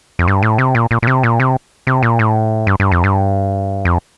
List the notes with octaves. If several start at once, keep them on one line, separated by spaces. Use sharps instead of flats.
F2
G2
A2
C3
A#2
A#2
A#2
C3
A#2
C3
C3
A#2
A2
G2
G2
F2
G2
F2